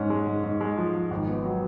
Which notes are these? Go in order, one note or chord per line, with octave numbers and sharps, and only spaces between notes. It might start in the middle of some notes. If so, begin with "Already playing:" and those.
Already playing: G#2 C#4
G#3
G#2
G#2
G#3
F3
F3
G#1
B3
F#3